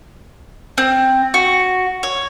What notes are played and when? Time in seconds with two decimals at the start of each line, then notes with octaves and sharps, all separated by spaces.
0.78 C4
1.34 F#4
2.03 C#5